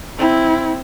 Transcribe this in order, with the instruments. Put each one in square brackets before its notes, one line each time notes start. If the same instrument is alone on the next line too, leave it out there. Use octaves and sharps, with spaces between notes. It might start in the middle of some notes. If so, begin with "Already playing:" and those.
[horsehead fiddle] C4 E4